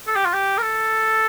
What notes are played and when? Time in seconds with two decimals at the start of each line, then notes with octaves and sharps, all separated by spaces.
0.07 A4
0.16 G4
0.25 F4
0.34 G4
0.58 A#4
0.62 A4